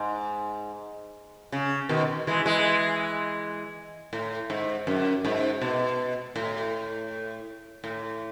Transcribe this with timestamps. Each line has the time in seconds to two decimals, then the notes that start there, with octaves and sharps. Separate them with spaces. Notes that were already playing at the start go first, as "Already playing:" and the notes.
Already playing: G#2
1.52 C#3
1.89 B2 D#3
2.27 E3 G#3
2.45 E3 G#3
4.13 A2
4.50 G#2
4.87 F#2
5.25 G#2
5.61 B2
6.36 A2
7.84 A2